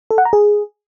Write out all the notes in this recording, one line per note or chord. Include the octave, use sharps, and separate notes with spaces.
A4
F#5
A#5
G#4